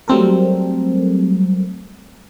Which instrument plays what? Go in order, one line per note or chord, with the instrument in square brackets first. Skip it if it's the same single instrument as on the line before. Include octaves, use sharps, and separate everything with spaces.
[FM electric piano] F#3 G3 A3 C4 A4 A#4